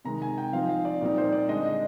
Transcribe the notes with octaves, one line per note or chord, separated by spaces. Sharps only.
C3 D#3 G#3 A#5
G#5
G5
F3 C4 D#4 F5
F5
D5
A#2 G3 C4 D#4 D5
C5
D5
D3 G#3 D4 D#5
D#5